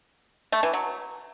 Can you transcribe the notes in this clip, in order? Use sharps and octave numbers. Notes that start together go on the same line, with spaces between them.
A3
E3
F#3